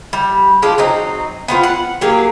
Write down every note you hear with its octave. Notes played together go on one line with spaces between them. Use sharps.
G3
G#3 D4 F4 G4
F#3 C4 D#4
B3 C4 F4
F#5
F#3 A#3 G4 G#4